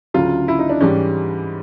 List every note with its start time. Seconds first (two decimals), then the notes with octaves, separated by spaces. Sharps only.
0.14 D2 C#3 F#3 F4
0.48 E4
0.59 D#4
0.69 D4
0.81 G#2 E3 G3 C#4